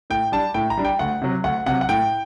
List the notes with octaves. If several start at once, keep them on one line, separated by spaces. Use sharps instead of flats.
A2 G5
G3 D4 A5
A2 G5
A#5
G3 D4
G5
D2 F#5
C3 F#3
D2 F#5
C3 F#3 F#5
F#5
A2 G5